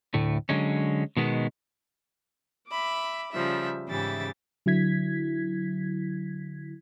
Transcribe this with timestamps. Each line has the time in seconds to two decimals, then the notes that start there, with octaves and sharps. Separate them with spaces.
0.14 D2 A2 A3
0.49 D3 F#3 G#3 C#4
1.17 B2 D#3 G#3 B3
2.68 E5 B5 D6
3.32 C#3 F3 G3 E5
3.88 G#2 C#3 E3 G4 E5 A6
4.66 D3 F#3 E4 G#6 B6